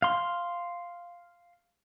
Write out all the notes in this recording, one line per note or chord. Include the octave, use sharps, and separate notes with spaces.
F5 C6